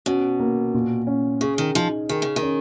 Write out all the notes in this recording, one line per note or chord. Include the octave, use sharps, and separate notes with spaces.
B2 C#4
A#3
A#2
C#4
C#3 G#4
D#3
F3 D#4
D#3 G#4
C#3
D#3
C#4